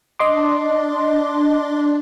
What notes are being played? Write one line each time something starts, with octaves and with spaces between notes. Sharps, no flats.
D4 D#5 C6 D6